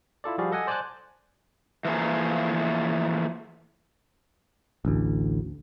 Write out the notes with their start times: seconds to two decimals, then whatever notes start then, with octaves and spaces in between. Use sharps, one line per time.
0.24 E4 F4 A4 D5
0.38 F3 G3 F#4 G#4 D5 F5
0.52 A4 D#5 F#5 G#5
0.67 C5 D5 G#5 A5 D6 F#6
1.85 E3 F3 A3 A#3 G#4
4.85 A1 D2